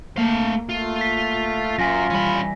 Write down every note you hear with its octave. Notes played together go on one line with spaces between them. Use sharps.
A3 A#3 F5
A3 F4
B6
F#2 F4 G#5 A#6
E3 G3 C#4 B5